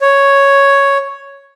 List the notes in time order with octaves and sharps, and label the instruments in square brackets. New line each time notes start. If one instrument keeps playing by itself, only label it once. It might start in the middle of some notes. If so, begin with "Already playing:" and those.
[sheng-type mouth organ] C#5